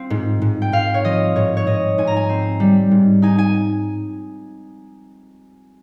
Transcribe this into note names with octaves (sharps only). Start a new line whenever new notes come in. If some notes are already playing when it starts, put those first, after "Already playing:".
Already playing: C4 F4
G#2
G#2
G5
G#2 F5
C#5
F3 D#5
G#2 C#5
C#5
G#2 D#5
G#2 G#5
A#5
G#5
C4
G3
G#2
D#4 G#5
G#5